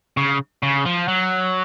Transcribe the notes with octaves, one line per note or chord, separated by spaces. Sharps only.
C#3
C#3
F3
F#3